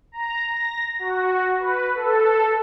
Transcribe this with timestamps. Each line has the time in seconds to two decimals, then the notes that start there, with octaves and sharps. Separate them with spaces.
0.12 A#5
0.46 A#6
0.99 F#4
1.60 B4
1.95 A4